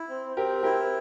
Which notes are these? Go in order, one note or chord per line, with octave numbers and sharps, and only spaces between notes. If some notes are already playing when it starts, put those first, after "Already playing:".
Already playing: E4
C4
C4 G4 A#4
E4 G4 A#4